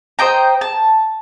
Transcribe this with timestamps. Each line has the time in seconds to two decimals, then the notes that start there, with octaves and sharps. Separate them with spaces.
0.19 C5 D#5 G5 A#5
0.61 A5